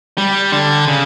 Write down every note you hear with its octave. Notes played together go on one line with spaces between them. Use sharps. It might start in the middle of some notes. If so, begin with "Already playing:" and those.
G3
D3
C#3